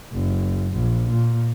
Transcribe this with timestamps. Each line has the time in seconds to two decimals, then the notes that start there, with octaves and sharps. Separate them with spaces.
0.13 F#1
0.74 A#1
1.10 A#2